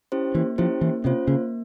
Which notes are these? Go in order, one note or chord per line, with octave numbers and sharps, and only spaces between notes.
C#4 E4 G4 C5
E3 A#3
F3 C#4 E4 G4 C5
E3 A#3
C3 C#4 F4 C5
C#3 A#3